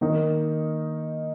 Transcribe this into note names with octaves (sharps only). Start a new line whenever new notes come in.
D#3 A#3 D#4